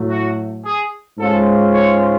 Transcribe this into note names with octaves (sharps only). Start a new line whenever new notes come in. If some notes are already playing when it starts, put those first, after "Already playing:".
Already playing: A2 F#3 A3
F#4
G#4
G#2 G#3 C#4 F4 A4
C#5